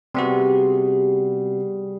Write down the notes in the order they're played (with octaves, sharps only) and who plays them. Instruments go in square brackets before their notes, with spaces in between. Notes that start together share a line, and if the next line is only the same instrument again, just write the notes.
[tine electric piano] C3 B3 F#4 [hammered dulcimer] G3 G#4 C6